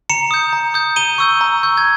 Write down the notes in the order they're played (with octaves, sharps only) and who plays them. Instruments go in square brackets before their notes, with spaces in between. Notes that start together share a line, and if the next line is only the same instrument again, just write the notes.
[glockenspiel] A#5 C#7 E7
D#6 G6
A#5
D#6 G6
A#5 D#7 G7
C#6 E6 G6
A#5
C#6 E6 G6
G#6